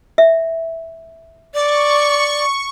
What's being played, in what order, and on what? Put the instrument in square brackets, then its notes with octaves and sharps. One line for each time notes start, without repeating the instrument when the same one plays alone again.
[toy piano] E5
[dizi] D5 [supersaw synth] C#6